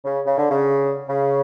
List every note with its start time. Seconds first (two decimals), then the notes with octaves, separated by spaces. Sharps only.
0.05 C#3
0.26 C#3
0.38 D3
0.51 C#3
1.09 C#3